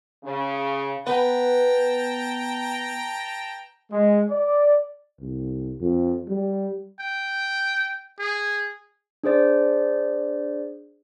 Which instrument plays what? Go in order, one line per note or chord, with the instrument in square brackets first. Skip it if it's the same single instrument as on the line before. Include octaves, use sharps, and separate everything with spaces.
[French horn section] C#3
[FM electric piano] B3 [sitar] B4 [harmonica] G5 A5 A#5
[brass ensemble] G#3
D5
[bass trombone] C2
F2
G3
[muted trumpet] G5
G#4
[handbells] D4 G#4 C5 D5